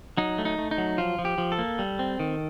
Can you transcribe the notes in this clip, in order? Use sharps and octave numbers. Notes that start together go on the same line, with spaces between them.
F#3 D#4
A3
D#4
A3
D#4
F#3
F3 F4
F3
G4
F3
A4
A#3
G3
C4
D#3